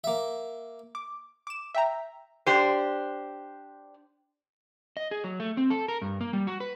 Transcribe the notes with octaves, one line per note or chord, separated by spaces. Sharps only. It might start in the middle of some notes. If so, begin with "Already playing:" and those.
A#3 E5
D6
D6 E7
E5 G5 A#5
D4 G4 C5
D#5
G#4
F#3
A3
C4
A4
A#4
G2
A#3
G3
F#4
B4